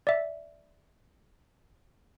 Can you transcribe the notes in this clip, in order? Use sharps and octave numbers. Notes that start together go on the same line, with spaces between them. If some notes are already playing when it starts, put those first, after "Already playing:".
D5 E5